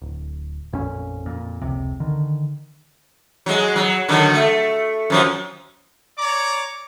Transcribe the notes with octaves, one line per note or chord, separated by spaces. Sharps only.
D1
A1 F2 A#2 C#4
F2 A#2
F1 C#2 C3
D3 D#3
F#3 G#3
F#3
D3 D#3 F#3
A3
F#2 F3 F#3
C#5 D5 A#5 D6